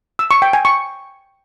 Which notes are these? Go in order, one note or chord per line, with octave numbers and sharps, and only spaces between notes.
E6
C#6
G5
G#5
C#6